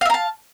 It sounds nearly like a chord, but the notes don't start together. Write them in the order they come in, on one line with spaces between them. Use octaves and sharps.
F5 E5 A#5 A5